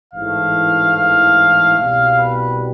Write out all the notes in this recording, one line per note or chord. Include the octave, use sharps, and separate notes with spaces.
A1 G#2 E3 A3 F5
F5
C2 B2 G3 B3 F5
B4